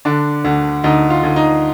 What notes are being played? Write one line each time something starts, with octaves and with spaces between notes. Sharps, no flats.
D3 D4
D2
D2 D#4
F4
D2
D#4